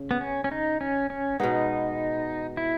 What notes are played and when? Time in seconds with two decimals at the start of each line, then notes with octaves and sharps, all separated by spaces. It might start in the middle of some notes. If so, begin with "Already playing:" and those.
Already playing: C#3
0.11 B3
0.21 C#4
0.44 C#4
0.51 D#4
0.81 C#4
1.10 C#4
1.40 B2 G#3 B3 D#4
2.57 E4